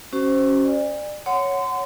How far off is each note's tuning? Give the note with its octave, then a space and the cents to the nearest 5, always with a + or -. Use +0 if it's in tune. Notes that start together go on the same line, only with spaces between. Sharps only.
C#4 -5 F#4 +35 C5 +0
D5 +30 G#5 -40
C#5 +0 F#5 +0 C6 -30